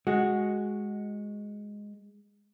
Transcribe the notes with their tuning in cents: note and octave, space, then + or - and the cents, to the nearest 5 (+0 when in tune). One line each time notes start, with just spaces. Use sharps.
G#3 +0 F#4 +0